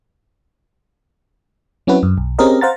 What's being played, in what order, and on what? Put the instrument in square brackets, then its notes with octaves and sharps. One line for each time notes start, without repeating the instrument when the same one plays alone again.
[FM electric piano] F#3 C4 C#4 E4 F#4 B4
F#2
B1
C4 C#4 G4 G#4 A#4 D#5
C5 F5 F#5 A#5 A6